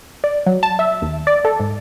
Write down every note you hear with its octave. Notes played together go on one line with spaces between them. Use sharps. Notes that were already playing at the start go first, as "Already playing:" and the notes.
D5
F#3
A5
E5
D#2
D5
A4
G#2